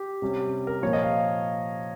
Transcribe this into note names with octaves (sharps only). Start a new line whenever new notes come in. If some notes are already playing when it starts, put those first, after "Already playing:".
Already playing: G4
C3 G3 C#4
A#4
A#2 F3 A#3 C#5
D#5
F5